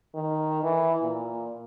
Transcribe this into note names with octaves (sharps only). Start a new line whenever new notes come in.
D#3
E3
A#2